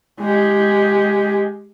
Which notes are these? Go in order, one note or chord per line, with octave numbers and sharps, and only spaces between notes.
G#3 G4